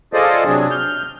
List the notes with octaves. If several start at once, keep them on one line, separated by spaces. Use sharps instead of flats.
F4 G#4 A4 C5 D5 D#5
C3 F#3 D4 G#4
F6 G6